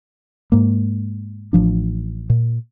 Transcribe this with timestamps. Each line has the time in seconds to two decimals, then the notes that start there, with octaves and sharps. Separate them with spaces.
0.52 G#2 A#3
1.53 A1 F3 D4
2.30 A#2